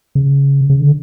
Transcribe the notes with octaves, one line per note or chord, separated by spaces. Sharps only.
C#3
C#3
D3